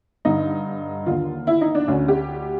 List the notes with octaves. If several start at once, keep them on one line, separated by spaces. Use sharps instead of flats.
G2 D3 D#4
D#2 D3 F4
E4
D#4
D4
D2 D3 C#4
G4